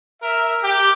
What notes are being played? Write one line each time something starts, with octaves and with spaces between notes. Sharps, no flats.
A#4 E5
G4